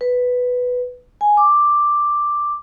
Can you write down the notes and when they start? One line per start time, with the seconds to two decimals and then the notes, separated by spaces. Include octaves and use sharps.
0.01 B4
1.21 G#5
1.37 D6